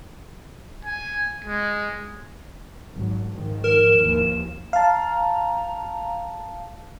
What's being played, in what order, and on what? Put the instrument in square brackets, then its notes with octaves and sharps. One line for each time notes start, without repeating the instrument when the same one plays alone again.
[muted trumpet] G#5
G#3
[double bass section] G#1 F#3
G#2 D#3 F3
[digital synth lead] A#4 [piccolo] E7
[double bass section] D#2 E3 F3
[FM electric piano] F5 A5 [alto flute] A#5